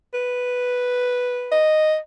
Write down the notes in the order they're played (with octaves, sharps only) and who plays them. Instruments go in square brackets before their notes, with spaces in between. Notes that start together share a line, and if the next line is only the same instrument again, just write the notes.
[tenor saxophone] B4
[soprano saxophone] D#5